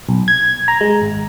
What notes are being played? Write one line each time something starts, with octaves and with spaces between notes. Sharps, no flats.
B1
G#6
A#5
G#3
G#1